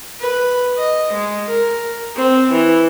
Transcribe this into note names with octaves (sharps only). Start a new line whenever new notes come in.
B4
D#5
G#3
A#4
C4
E3